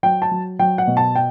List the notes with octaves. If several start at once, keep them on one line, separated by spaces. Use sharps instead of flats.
F#3 G5
A5
F#3
F#3 G5
F#5
B2
A5
G5